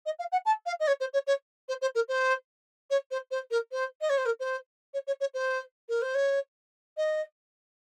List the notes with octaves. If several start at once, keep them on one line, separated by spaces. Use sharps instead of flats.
D#5
F5
F#5
A5
F5
D#5
C#5
C5
C#5
C#5
C5
C5
A#4
C5
C#5
C5
C5
A#4
C5
D#5
C#5
C5
A#4
C5
C#5
C#5
C#5
C5
A#4
C5
C#5
D#5